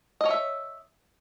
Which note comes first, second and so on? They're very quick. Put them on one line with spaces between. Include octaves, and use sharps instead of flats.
D#5 C#5 E5